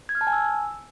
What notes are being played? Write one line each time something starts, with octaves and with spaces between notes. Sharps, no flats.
G#6
F6
A5
G#5
E6